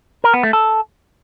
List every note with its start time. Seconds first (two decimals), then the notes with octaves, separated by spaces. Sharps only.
0.24 A#4
0.34 B3
0.43 A3
0.53 A4